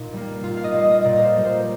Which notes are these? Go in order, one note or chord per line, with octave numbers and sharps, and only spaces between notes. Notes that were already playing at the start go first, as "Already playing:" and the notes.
Already playing: A#2 D#4
G3 A#3
A#2 F4
F5
D#5
G3 A#3
D#5
D#5
A#2 D5
A#4
C5
G3 A#3
C5